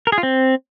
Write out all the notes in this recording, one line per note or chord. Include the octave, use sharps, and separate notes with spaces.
A#4
G#4
F4
C4